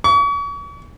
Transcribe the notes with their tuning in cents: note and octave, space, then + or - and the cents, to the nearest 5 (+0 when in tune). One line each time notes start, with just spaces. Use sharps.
C#6 +40